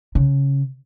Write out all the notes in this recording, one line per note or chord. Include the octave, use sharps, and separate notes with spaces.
C#3